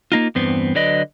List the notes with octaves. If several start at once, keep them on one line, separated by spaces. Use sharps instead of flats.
A#3 D#4 F4
E2 G2 B3 C4
D3 F#3 B4 D5 D#5